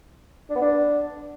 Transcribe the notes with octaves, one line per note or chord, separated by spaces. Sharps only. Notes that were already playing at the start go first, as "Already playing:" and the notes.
D4
B3
D4